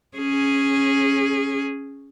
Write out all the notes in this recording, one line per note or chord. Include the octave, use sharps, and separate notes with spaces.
C#4 G#4